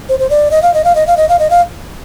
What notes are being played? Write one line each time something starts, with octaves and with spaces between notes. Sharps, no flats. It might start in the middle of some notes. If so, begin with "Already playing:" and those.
C5
C5
D5
D#5
F5
D#5
F5
D#5
F5
D#5
F5
D#5
F5